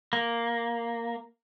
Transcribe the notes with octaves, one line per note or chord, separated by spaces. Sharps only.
A#3